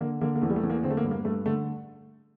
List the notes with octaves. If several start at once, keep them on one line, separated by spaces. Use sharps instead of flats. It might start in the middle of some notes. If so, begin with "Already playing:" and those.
D3 A#3
D3 A#3
A#3
E2 A3
G3
A3
E2
A#3
D3 C4
A3
A#3
G2
A#3
G2 A3
D3 A3